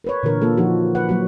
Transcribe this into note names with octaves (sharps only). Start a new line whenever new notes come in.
A#4 B4 C#5
A#2 D3 E3 A#4
A#3 F4 A4
F3 D#4 F#4
B4 F#5
F#3 A#3 F#4